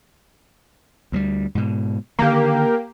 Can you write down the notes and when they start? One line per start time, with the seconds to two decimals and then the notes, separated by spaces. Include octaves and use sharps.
1.12 D2 F#3 G3
1.55 G#2 B2
2.19 D3 D#3 A#3 G4